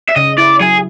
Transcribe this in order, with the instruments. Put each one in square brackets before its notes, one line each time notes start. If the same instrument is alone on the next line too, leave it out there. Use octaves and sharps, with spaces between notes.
[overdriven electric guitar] E5
[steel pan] C#3 [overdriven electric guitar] D#5
[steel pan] E4 [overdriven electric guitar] D5
[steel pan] F#3 [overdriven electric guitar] G#4